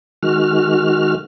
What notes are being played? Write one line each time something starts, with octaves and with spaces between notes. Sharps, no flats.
D#3 G#3 F#4 F6